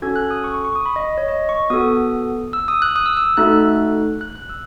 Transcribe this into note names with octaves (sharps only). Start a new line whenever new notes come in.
C#4 F#4 A4 G#6
F#6
D#6
C#6
C#6
C#6
D#6
B5
D#5
C#5
D#5
C#6
B3 F#4 A4 D#6
E6
D#6
F#6
D#6
E6
E6
A3 D#4 F#4 A4 F#6
F#6
F#6
E6